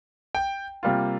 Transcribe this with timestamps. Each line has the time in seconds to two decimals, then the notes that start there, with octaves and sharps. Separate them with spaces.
0.35 G5
0.83 C3 G3 A#3 F4